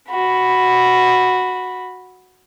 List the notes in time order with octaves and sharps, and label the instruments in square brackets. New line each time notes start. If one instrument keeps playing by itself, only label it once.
[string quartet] F#4 B5